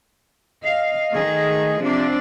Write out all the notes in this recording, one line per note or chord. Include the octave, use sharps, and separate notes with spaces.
D#5 F5
D#3 A3 G#4
C3 F3 C4 D4